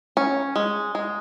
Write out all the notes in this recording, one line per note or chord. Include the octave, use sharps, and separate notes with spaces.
C#4
G#3
G#3